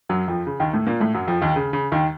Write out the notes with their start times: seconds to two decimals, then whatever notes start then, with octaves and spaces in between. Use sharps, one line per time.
0.09 F#2 F#3
0.28 F2 F3
0.47 C#3
0.60 D#2 D#3
0.73 A2 A3
0.87 A#2 A#3
1.00 A2 A3
1.14 F#2 F#3
1.28 F2 F3
1.42 D#2 D#3
1.56 C#3
1.73 C#3
1.92 D#2 D#3